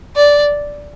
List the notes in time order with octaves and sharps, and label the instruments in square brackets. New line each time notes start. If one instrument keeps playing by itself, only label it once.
[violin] D5